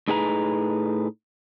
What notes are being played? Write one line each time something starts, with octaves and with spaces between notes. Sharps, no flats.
A2 D#4 G#4 B4 F#5 A#5